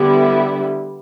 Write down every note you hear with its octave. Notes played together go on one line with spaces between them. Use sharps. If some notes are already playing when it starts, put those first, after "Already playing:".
Already playing: D3 G3 B3 E4